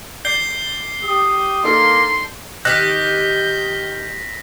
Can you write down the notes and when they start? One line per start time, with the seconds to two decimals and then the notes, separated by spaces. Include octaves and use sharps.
0.25 D5 G6 C7 G7
1.04 G4 D#6
1.64 A#3 D4 D#4 A4 C6
2.65 D#3 G4 F#6 G6 A#6 B6